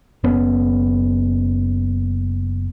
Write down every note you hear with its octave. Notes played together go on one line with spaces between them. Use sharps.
F#1 B3 C#4